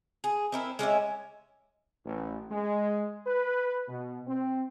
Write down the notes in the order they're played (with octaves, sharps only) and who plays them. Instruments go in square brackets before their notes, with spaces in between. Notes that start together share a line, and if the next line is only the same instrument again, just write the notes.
[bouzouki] G#4
C4 E4 A#4
G#3 C#4 G4 E5
[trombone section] A1
G#3
B4
B2
C4